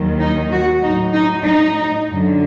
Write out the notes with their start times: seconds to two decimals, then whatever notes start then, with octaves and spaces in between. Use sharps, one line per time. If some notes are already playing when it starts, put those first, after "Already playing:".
Already playing: D#2 D#3 F#3
0.19 D#4
0.51 F#4
0.82 A2 F#3 D#4
1.13 D#4
1.45 D#4
2.08 F#2 D3 F#3